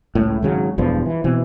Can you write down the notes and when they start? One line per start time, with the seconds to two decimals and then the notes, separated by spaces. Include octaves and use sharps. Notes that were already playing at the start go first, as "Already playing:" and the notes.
0.15 C#2 A2
0.43 G#1 C#3 F#3
0.78 E1 E2 G2 F3
1.06 E3
1.24 B2 E3 C4